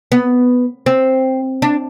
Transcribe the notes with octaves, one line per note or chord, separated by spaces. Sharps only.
B3
C4
D4